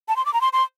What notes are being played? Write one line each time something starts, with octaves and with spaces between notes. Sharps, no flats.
A5
C6
D6
A#5
C6
C6